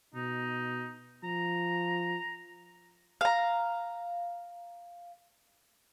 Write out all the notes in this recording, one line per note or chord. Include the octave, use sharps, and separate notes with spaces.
B2 D#4
F3 A#5
F5 A#5